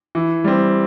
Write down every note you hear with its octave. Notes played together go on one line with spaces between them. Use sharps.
E3
G3 C4